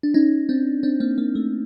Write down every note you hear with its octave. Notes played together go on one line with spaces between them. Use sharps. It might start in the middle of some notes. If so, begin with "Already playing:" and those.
D4
C#4 D#4
C4 D4
C4 D4
A#3 C4
A#3
A3